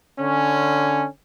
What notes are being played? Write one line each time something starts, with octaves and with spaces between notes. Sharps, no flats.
D3 C#4